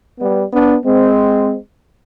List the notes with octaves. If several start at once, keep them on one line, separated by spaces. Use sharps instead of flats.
G3 B3
B3 D4
G#3 C4